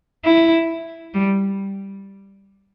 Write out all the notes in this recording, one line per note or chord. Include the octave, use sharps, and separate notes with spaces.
E4
G3